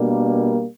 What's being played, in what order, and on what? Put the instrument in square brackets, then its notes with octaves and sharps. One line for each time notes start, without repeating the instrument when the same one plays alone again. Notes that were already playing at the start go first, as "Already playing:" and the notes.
Already playing: [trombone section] B2 G3 A#3 D4